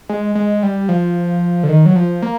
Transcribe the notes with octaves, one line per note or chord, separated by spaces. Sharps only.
G#3
G#3
G3
F3
D3
D#3
F#3
F3
A#3